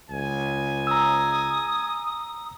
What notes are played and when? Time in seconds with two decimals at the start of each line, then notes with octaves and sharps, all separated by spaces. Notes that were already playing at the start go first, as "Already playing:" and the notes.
0.11 C#2 G#5
0.87 A#5 D#6 E6